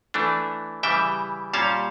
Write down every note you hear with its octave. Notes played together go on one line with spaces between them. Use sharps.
E3 A3 D4
C#3 E3 G3 E5 G5
A#2 G3 C#4 F5 A5